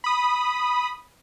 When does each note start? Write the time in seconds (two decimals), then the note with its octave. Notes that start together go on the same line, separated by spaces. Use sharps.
0.04 B5 D#6